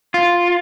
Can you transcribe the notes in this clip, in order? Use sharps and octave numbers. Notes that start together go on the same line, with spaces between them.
F4